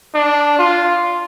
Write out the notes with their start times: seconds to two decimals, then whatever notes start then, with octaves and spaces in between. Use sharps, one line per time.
0.14 D4
0.59 F4